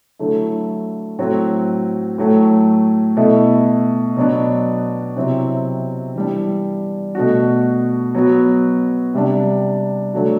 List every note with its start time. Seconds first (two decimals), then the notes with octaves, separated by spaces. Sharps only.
0.19 D3 F#3 A3 E4
1.18 A2 F#3 C4 F#4
2.18 A2 F#3 A3
3.17 B2 A3 E4
4.17 B2 F#3 B3 D4
5.16 C3 F#3 C4 E4
6.16 E3 G3 D4
7.15 B2 A3 D4 F#4
8.15 F#3 B3 F#4
9.14 C3 G3 D4
10.13 D3 F#3 A3 D4 F#4